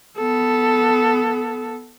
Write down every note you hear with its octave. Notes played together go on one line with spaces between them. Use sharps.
B3 A4